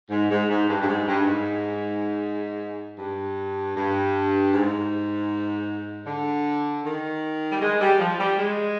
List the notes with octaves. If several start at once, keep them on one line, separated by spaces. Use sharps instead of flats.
G#2
G#2
G#2
G2
G2
G#2
G2
G#2
G2
G2
G#2
D3
D#3
G3
G#3
G3
F3
G3
G#3